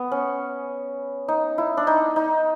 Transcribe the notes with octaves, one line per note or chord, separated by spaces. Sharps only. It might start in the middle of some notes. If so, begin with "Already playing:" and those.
Already playing: B3
C#4
D#4
E4
D4
D#4
D#4